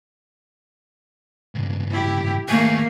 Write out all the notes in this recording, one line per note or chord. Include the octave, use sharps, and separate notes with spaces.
C#2 G2
E4 G4
D#2 A3 A#3 G#4